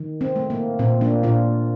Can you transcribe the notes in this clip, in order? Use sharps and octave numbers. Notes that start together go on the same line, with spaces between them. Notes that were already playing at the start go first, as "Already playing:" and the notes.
Already playing: D#3
C4
A3
A#3
A#2 C4
A#3 D4
A#2 D4 F4